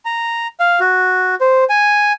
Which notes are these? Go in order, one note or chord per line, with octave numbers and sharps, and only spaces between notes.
A#5
F5
F#4
C5
G#5